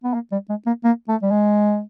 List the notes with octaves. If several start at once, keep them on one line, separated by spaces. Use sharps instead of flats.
B3
A#3
G3
G#3
A#3
A#3
A3
G3
G#3